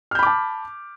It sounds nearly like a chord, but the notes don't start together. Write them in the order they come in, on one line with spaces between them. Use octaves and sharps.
F6 G6 B5 D6 A5